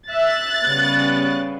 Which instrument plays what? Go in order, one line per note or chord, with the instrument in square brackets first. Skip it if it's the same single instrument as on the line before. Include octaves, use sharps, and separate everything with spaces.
[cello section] E5 [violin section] F#6 A6
[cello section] C#3 G3 B3